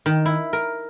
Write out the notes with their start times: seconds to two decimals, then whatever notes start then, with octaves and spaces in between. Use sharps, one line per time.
0.06 D#3
0.25 E4
0.53 A#4